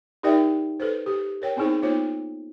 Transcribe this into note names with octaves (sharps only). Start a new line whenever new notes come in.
D#4 G4 A#4 D5 E5 G5
A4 B4 C5
G4
A#4 C#5 G5
B3 C4 D#4 E4 G#4 C5
A#3 B3 D#4 F4 C5 C#5